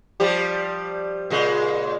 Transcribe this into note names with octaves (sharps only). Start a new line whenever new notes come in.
F3 G3 G4
A#2 C#3 G#3